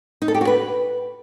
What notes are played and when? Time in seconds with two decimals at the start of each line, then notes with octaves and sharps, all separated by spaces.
0.22 D#4
0.28 A4
0.34 G4
0.41 F#4
0.47 B4